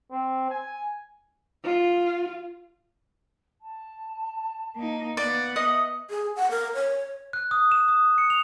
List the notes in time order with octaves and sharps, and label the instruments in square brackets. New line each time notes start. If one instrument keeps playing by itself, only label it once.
[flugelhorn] C4
G#5
[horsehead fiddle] F4
[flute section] A5
[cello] A#3 D#4
[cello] B3 F#5 [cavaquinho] D5 [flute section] F5
[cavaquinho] D#5 [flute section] E5 D#6
[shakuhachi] G#4
F#5
A#4
C#5
[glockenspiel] F#6
D#6
E7
D#6
C#7
F7